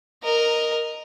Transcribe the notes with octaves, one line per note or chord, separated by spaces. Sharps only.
A#4 D#5